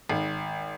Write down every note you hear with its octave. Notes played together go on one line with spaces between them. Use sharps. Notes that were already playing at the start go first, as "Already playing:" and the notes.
G#1